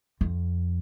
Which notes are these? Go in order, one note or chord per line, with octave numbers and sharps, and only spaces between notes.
F2